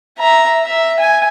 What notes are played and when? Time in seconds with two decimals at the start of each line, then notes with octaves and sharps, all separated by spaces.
0.19 E5 A#5
0.64 E5
0.99 G#5